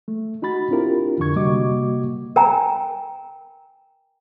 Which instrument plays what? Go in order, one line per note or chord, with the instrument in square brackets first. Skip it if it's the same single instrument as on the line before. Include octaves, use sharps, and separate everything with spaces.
[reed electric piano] A3
D#4 F#4 B5 A6
C4 D4 E4 F4 G4 A#4
F2 D3 D4 C#6 G#6
C3 G3 A#3 F#4 D#5 D6
[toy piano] A#4 G5 G#5 A#5